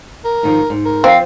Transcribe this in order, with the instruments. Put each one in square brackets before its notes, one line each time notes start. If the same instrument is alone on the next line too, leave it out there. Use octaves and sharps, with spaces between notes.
[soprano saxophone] A#4
[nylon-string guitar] G#2 D#3 F3
G#2
[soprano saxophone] A#4
[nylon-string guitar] F3 [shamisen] C4 [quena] F5